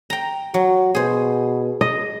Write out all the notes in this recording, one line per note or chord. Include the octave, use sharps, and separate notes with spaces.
G5 A#5
F#3 F#4
B2 G#4 C5
D#5